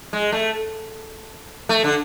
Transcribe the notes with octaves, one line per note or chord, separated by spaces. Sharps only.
G#3
A3
A3
D3